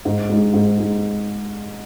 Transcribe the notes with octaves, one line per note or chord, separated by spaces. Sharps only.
G#2
G#3 D#4
G#2
G#3 D#4